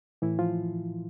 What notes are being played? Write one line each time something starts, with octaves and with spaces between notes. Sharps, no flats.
A2 E3 E4
F3 F4